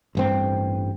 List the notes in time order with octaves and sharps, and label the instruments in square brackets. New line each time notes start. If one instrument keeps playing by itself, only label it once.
[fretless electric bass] A1 G2 C4